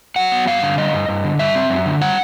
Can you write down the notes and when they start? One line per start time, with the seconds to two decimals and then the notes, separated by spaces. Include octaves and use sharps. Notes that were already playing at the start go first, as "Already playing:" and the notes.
0.16 F#3 F#5
0.32 B3
0.47 G2 F5
0.62 D3
0.78 G3 D#5
0.93 G2
1.09 G2
1.24 D3
1.39 G3 E5
1.55 C4
1.70 F#2
1.86 D3
2.01 G3 F#5